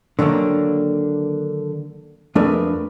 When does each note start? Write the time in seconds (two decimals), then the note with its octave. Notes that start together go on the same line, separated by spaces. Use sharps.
0.19 D3 D#3 F#3 A#3 D4
2.35 F2 A3 D4 G#4 A#4 B4